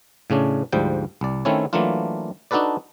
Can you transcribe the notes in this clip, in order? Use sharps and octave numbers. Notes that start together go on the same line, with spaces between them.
A2 C#3 C#4 D4
D2 G#2 F3 G3 G5
C2 D5
D#3 A3 C4 C#4 E4 C#5
E3 F#3 A3 A#3 D4 F4
D4 D#4 F#4 A4 B4 D5